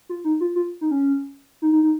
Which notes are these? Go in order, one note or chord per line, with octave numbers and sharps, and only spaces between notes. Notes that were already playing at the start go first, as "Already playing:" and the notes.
F4
D#4
F4
F4
D#4
C#4
D#4
D#4
D#4